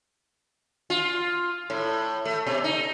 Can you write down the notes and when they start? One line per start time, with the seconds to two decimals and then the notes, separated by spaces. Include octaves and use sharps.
0.90 F4
1.70 A2
2.25 A3
2.46 B2
2.64 D#4